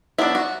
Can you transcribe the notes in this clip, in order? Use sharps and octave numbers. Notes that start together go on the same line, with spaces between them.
F#3 B3 D4 E4
F#4